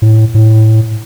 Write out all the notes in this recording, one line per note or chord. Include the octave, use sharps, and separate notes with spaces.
A2
A2